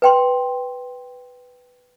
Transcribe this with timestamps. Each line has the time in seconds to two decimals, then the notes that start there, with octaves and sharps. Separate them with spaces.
0.02 B4 G5 C6